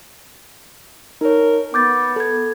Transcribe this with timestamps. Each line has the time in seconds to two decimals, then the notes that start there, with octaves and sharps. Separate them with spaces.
1.21 D#4 A#4 C#5
1.74 B3 D6 G6 A6
2.16 A4 G#6